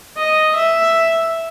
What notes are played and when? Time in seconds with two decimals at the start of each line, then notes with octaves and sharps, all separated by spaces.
0.17 D#5
0.55 E5